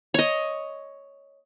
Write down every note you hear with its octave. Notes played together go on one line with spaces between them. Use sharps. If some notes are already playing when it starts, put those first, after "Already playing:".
C#5 D#5